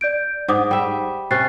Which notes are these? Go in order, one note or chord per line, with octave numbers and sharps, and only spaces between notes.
D5 G6 D7
G#2 F#5 D6 D#6
G3 E5
C3 C#4 F#6 A6 C7